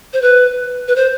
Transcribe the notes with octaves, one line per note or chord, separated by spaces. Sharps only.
C5
B4
B4
C5